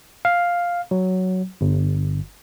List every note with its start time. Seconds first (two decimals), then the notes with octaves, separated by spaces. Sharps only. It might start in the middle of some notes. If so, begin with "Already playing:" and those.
0.25 F5
0.91 F#3
1.61 G1